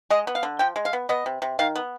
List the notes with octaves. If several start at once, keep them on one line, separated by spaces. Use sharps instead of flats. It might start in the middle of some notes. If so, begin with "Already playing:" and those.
G#3 D#5
B3
F5
D3
F3 G5
G#3
F5
B3
B3 D#5
C3
C3
D#3 F5
B3